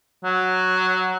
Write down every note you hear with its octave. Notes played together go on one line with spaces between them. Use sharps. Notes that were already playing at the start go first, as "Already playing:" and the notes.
F#3